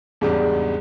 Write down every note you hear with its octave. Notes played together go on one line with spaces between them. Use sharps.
E2 G#2 C#3 G3 G#3 D4